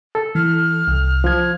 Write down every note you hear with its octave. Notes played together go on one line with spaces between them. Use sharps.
A4
E3 F6
C2
F3 G#6